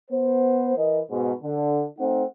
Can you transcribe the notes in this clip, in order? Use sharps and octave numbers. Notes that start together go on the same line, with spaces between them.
B3 C5
E3 A#4 D#5
G#2 B2
D3
A3 C4 D#4 F#5